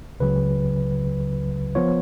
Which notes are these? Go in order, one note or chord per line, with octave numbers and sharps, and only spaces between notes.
C#2 C#3 F#3 B4
F3 B3 F4 C#5